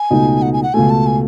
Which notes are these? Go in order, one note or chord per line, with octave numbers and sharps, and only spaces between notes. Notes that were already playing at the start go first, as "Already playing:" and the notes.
Already playing: G#5
C#2 B2 A3 D#4
F#5
G#5
F#5
C#2 B2 A3 G#5
A5
G#5